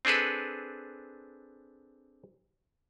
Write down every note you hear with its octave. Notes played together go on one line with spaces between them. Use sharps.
C4 D4 G#4 A4 B4